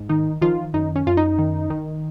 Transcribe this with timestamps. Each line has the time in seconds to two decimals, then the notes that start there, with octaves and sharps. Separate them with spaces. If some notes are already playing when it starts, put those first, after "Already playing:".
Already playing: G#2
0.09 D#3 D#4
0.41 D#3 F3 F4
0.74 F#2 D#4
0.96 C#4
1.07 F#2 F4
1.17 D#4
1.39 D#3
1.70 D#3